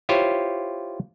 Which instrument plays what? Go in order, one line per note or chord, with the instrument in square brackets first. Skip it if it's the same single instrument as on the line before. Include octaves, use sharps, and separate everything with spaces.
[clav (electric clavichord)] E4 F4 G4 C5 C#5